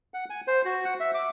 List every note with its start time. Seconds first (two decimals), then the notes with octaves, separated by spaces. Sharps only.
0.14 F#5
0.30 G#5
0.47 C5
0.65 F#4
0.85 F#5
1.00 E5
1.14 D6